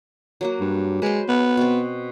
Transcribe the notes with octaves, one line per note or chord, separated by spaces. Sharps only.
F#3 A#3 F#4
G2
G#3 B4 C5
B3
B2 C4